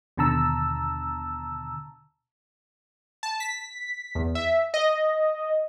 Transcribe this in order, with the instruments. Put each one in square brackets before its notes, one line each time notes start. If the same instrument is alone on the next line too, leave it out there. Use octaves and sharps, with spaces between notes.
[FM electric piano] D#2 B2 D3 A5 A#5 E6
[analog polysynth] A5
B6
E2
E5
D#5